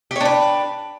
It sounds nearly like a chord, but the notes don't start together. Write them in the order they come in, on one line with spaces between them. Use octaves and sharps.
G4 C#5 D4 B4